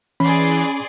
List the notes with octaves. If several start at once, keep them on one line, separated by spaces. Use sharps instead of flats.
E3 C#4 G#4 D5 B5 C6